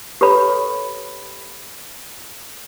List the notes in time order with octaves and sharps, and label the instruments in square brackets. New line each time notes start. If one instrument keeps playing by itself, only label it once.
[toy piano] G4 A4 B4 C#5 B5